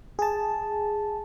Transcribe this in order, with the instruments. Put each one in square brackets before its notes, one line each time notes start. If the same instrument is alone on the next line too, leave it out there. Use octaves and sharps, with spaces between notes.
[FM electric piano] G#4 A5